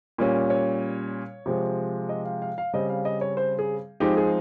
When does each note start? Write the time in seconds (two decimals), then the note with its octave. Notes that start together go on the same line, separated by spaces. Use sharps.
0.18 A#2 G3 C#4
0.50 C#5
1.46 C3 F3 G#3
2.09 D#5
2.25 F5
2.42 F5
2.58 F5
2.73 C#3 G3 C4 D#5
2.89 F5
3.05 D#5
3.21 C#5
3.37 C5
3.59 G#4
4.00 F3 G#3 C4 D#4 G4
4.17 G#4